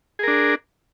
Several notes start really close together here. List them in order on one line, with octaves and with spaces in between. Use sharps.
G#4 A#4 D4